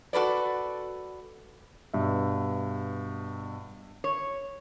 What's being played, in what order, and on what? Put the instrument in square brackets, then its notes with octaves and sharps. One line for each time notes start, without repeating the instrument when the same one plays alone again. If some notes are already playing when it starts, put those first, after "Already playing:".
[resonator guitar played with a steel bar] F#4 A4 B4 D5
[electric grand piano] G2 B2 E5
[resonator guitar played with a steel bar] C#5